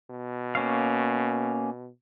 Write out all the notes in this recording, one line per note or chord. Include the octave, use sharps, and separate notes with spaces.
B2
A#3 C#4 F5